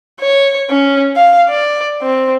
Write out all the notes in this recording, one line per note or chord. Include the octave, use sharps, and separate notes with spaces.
C#5
C#4
F5
D5
C4